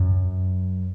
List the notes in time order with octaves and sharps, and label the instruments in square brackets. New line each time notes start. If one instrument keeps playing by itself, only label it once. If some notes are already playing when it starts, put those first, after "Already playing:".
Already playing: [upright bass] F#2